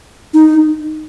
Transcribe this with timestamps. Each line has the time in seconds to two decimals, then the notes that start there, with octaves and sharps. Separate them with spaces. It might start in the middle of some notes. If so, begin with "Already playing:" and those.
0.34 D#4